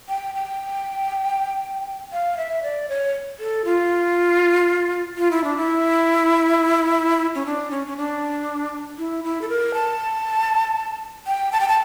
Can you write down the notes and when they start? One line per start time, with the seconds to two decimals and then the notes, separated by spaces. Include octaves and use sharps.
0.09 G5
0.35 G5
2.12 F5
2.37 E5
2.63 D5
2.89 C#5
3.39 A4
3.65 F4
5.18 F4
5.31 E4
5.44 D4
5.57 E4
7.35 C#4
7.46 D4
7.71 C#4
7.87 C#4
7.97 D4
8.98 E4
9.24 E4
9.42 A4
9.49 A#4
9.74 A5
11.27 G5
11.53 A5
11.60 G5
11.68 A5